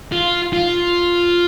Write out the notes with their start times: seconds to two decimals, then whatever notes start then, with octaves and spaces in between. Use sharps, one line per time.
0.12 F4
0.53 F4